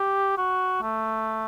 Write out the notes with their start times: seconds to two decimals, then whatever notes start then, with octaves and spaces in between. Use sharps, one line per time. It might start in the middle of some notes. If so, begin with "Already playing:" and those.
Already playing: G4
0.37 F#4
0.82 A3